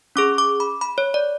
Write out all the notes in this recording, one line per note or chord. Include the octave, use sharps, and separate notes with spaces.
C#4 G#4 D6
D6
B5
B5
C#5
D5